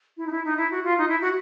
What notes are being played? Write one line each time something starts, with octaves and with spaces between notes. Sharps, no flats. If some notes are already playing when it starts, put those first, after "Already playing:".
E4
D#4
E4
D#4
E4
F#4
F4
D#4
E4
F#4